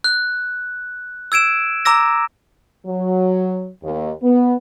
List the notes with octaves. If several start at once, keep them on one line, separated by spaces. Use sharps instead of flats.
F#6
E6 G#6 D7 E7
A#5 D6 E6 A#6
F#3
D#2
B3